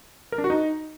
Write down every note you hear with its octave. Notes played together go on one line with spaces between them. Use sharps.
A#4
D4
F#4
D#4